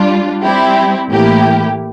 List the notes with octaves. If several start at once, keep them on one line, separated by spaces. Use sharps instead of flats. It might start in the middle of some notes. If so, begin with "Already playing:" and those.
Already playing: G3 D4 F4
G3 C4 E4 G4
A2 E3 A#3 E4 G4